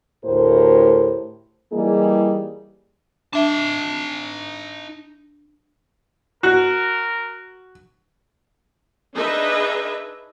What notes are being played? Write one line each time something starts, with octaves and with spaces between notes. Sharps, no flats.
D2 A2 G4 A#4 C5
E3 G3 A#3 D#4 G#4
D4 D#4 E5 A5
F#4 A#4
D4 D#4 G#4 B4 D#5 E5